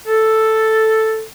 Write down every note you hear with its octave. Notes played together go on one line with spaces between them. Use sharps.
A4